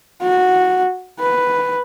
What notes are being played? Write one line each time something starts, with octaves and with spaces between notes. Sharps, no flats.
F#4
B4